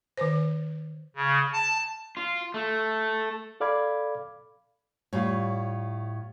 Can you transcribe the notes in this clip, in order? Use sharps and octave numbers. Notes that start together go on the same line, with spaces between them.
D#3 B4 C5
C#3
A5
F4
A3
A4 D5 F5 B5 D6 G#6
A2 G3 F4 C#5